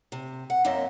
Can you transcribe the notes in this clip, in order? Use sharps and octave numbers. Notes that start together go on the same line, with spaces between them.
C3
F#5
F#2 A#3 C4 D#5 E5